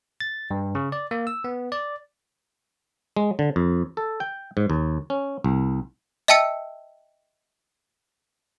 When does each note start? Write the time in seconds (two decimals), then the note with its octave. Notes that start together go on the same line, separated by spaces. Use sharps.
0.20 A6
0.51 G2
0.75 C#3
0.92 D5
1.11 A#3
1.27 E6
1.44 B3
1.72 D5
3.17 G#3
3.39 D3
3.56 F2
3.97 A4
4.20 G5
4.57 G#2
4.70 D#2
5.10 C#4
5.44 C2
6.28 D#5 E5 G5 A5 E6 C#7